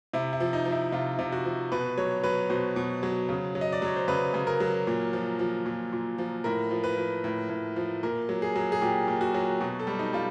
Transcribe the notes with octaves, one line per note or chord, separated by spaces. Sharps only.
C3 E4
E4
F3
D#4
F3
E4
C3 F4
C3
F#4
F3
B2 B4
F#3 C#5
F#3 B4
B2 C5
B2
F#3
C#3
F#3
D#5
D5
F#3 C#5
C5
C#3 B4
C#3
A#4
F#3
A#2
F3
F3
A#2
A#2
F3
A2 A#4
F3
B4
F3
A2
A2
F3
A#2 A#4
F#3
G#4
F#3
G#4
A#2 G4
A#2
F#4
F#3
B2
A4
G3
D#4
G3 F4